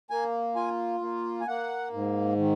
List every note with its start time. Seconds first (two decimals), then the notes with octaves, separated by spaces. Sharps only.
0.10 A#3 G#5
0.56 F4 G#5
1.01 A#3
1.41 G#5
1.47 A#3 F#5
1.93 G#2
2.38 D#3